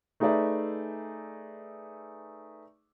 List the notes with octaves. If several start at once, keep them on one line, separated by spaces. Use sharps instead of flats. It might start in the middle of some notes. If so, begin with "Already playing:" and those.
A3 D#4 G#4 B4 D5 E5